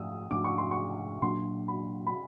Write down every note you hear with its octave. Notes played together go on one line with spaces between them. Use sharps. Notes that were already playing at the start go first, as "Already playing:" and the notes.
Already playing: G#2 F3 A3 D#6 E6
G#2 F3 A3 D4 D6
C#6
C6
C#6
A#2 F#3 A#3 D4 C6
B5
B5